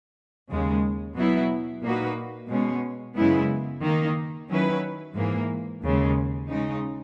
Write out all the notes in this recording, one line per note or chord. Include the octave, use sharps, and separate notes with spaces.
D#2 C#3 G#3
B2 F#3 B3 E4
A#2 A#3 D#4 F#4 B4
B2 G#3 C#4
F#2 C#3 G#3 B3 E4
D#3 A#3 D#4
D#3 F#3 C#4 E4 B4
G#2 E3 A#3
D#2 C#3 G#3
C#3 G#3 D#4